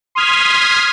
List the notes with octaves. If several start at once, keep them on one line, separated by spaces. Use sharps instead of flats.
C6 D#6 F6 G#6 B6